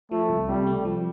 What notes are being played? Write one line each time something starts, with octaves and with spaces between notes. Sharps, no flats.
F3 A3
C2
C3 G3
A3
F3